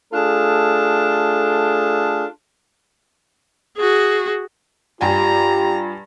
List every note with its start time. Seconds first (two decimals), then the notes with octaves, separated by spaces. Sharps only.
0.13 A3 D4 F4 G#4 A4
3.77 F#4 G#4
5.01 G2 F4 G4 G5 G#5 A#5